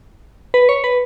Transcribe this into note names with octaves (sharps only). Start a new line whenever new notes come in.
B4
C#5
B4